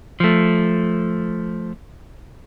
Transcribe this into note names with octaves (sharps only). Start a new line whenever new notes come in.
F3 A3